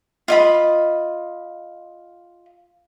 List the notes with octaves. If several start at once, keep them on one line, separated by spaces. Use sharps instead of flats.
F4 D#5 B5